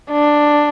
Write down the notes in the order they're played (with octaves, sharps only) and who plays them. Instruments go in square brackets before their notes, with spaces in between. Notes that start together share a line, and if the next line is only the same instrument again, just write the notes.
[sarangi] D4